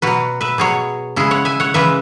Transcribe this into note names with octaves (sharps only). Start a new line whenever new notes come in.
B2 F#3 F#4 B4
B4 E5
B2 F#3 G#4 C#5
C#3 G#3 E4 G#4
C#5 F#5
E5 G#5
C#5 F#5
C#3 E3 G#3 B4 E5